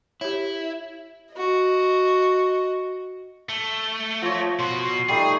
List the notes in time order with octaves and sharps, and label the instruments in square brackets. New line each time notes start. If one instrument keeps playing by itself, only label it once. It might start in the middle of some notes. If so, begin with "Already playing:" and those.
[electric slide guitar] E4 [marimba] G4 C#5
[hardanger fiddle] F#4 D#5
[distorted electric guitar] A3 [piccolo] G7
[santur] F3 C#5 [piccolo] A#6
[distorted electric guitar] B2 F#4 [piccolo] C6
[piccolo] C7
[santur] G3 A3 D#4 [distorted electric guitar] G#4